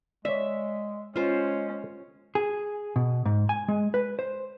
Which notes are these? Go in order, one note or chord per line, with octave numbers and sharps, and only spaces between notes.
G#3 C#5 D5 E5
G#3 C#4 F4 C5
G#4
B2
G#2
G#5
G#3
B4
C5